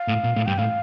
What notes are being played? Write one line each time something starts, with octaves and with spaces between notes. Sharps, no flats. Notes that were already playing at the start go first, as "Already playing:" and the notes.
Already playing: F5
A2
A#2
A2
G2 G5
A2 F5